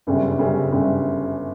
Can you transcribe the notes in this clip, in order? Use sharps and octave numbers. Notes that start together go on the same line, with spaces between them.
G1 F#2 C#3 G3
G1 F#2 C#3 G3
G1 F#2 C#3 G3